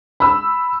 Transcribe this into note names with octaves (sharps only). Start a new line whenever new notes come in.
B5 E6